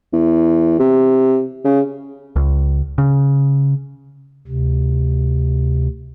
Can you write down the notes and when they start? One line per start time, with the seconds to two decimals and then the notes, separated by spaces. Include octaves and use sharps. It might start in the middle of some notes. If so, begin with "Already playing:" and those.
0.13 E2
0.79 C3
1.65 C#3
2.36 C#2
2.98 C#3
4.48 D2 C3